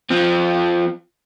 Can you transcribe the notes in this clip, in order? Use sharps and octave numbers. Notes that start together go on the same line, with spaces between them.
F3 C4